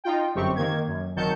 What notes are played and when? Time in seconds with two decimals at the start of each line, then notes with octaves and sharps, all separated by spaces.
0.04 D#4 F4 G5
0.35 G1 F#2 C4 G4 C#6
0.56 D#3 A#3 G#6
0.87 F#2
1.16 G#1 D#3 F#3 A5 G6 C#7